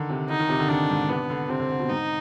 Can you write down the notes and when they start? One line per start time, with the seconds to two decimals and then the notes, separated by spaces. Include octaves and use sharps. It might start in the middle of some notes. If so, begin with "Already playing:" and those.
Already playing: D3 D#3
0.09 C3
0.30 D3 D#4
0.39 D#3
0.49 C3
0.60 D3
0.69 D#3 D4
0.90 G#2
1.09 C3 B3
1.30 D3
1.49 C3 C4
1.60 D3
1.70 D3
1.80 B2
1.90 G#2 D#4